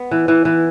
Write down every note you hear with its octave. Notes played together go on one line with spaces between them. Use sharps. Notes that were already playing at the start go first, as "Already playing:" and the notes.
Already playing: B3
E3
E3
E3